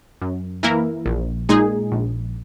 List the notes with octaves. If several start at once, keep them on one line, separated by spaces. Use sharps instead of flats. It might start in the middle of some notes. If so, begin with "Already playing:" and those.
F#2
E3 A#3 E4 A#4
A#1
A#2 G#3 D#4 G#4
A#1